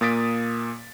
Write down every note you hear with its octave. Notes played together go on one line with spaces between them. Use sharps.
A#2 A#3 D#6 A6 B6 D7